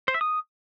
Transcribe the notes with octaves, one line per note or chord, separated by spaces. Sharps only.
C5
E5
D#6